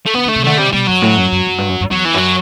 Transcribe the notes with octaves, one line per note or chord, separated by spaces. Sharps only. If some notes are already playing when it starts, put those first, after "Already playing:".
A3
D3 B3
D3 A3
C3
D3 A3
C3 G3
B2 G3
F#2 F#3
A2
F#2
F#2
F#2
G2
F#2
F#2
E2 F#3
E3
F#2 F#3